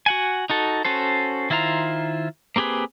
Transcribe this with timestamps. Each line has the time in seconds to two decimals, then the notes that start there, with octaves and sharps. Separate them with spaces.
0.06 F#4 F#5 G#5
0.50 D#4 F#4 A4
0.85 C#4 F#4 A4 C5
1.50 D#3 E4 F4 C5 A#5
2.56 A#3 C4 G4 G#4 B4